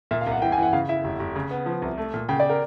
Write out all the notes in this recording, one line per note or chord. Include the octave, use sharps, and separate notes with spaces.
A#2 E5
F5
C2
F#5
E3 G5
G#5
E3 F#5
C#3 F5
E4 E5
F1
F1
C#3
B3
F3
C2
A3
A#2
C#3 G5
D5
A#4